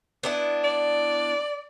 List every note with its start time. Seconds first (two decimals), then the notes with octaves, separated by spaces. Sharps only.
0.23 B3 D4 E4
0.64 D5